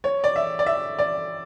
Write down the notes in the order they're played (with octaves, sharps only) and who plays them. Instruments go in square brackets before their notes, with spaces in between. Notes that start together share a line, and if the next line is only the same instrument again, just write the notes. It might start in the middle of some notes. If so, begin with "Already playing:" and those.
[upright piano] C#5
D5
E5
D5
E5
D5